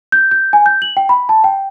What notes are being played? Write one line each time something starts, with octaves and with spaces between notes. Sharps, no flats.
G6
G6
G#5
G6
F#7
G5
B5
A5
G5